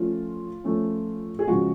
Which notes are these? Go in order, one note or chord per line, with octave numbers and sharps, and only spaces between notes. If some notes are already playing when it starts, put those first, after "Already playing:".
Already playing: F3 A3 C#4 F4
F3 A3 C#4
G#4
C#3 F3 G#3 F#4